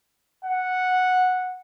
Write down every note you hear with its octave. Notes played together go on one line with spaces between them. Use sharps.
F#5